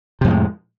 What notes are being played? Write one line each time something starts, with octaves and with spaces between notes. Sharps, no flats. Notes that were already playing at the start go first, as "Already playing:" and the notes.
F2 A2 C3 G#3